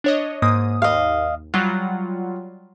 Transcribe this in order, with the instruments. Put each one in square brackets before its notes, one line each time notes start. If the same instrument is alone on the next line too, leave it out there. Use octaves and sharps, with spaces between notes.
[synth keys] D4 C#5 D#5
G#2 A#3 D#6
[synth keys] D#2 [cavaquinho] D#5 F5
[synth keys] F#3 G3 F4 [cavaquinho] F#5